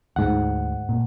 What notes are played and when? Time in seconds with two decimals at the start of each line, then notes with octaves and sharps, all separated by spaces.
0.16 D2 G#2 F#5
0.89 A#2